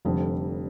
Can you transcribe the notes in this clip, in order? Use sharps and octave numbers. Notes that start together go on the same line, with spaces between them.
F1 F2 D3 G3